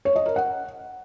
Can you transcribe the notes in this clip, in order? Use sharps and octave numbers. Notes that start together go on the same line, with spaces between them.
C#5
D#5
A#4
F#5